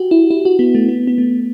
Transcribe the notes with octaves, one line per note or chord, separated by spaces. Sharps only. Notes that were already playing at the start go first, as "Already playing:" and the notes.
Already playing: F#4 G4
E4
E4
F#4
B3
A3
B3
B3
A3